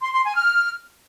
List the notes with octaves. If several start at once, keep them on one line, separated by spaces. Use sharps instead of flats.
C6
C6
G#5
F6